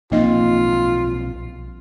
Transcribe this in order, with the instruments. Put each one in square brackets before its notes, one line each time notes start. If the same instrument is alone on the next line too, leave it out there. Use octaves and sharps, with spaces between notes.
[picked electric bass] B1 F3 C4 [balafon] A#3 D#4 D#5 [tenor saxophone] F4